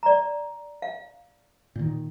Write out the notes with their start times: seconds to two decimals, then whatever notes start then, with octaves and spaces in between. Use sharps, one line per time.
0.03 D5 A#5
0.82 F5
1.76 A#2 D#3